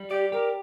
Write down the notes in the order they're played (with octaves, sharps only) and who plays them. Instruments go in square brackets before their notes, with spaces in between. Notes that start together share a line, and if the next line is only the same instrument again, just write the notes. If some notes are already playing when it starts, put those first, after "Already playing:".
Already playing: [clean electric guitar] G3
[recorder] G4 [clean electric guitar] D5
[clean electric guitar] G4 [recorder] A#4